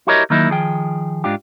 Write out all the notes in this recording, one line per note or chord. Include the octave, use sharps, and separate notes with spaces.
E4 F#4 G4 A#4 C#5 D#5
D#3 F#3 A#3 D#4 E4
D#3 F3 G#4 G5
G#2 D4 F4 G4